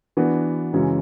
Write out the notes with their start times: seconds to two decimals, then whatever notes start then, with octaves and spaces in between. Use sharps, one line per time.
0.17 E3 B3 D4 F#4
0.73 F#2 C#3 E3 G#3 C#4